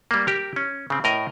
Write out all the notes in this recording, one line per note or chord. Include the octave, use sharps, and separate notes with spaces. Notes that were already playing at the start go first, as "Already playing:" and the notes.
G3 A#3
G4 A#4
C#4
C#3 C4
A2 A#4 D#5